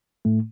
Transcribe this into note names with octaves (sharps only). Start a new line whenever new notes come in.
A2 A3